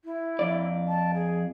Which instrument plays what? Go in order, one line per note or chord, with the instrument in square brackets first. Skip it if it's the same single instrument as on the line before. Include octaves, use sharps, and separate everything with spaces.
[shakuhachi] E4
[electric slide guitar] F2 D5
[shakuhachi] A5
G#4